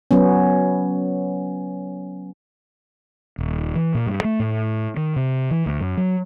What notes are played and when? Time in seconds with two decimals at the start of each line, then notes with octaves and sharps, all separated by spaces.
0.11 F#3 B3 C#4
3.38 D#1
3.76 E3
3.94 A#2
4.06 G2
4.24 A3
4.39 A2
4.97 D#3
5.16 C3
5.51 E3
5.66 D2
5.80 F#2
5.97 F#3